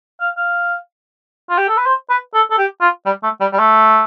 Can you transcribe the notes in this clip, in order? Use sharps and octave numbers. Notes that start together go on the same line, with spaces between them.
F5
F5
F4
G4
A4
B4
C5
B4
A4
A4
G4
F4
G3
A3
G3
G3
A3